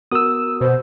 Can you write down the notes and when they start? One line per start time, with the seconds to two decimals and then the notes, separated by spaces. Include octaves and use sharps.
0.11 B3 F#4 A#4 D#6 E6
0.61 B2 C5